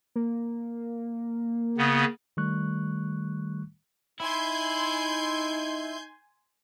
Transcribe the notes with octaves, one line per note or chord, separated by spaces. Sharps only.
A#3
C#3 B3
D#3 G3 A3 C#6 F#6
D#4 E4 G#5 C6 G6